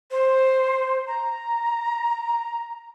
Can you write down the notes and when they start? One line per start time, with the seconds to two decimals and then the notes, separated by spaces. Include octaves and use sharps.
0.11 C5
1.07 A#5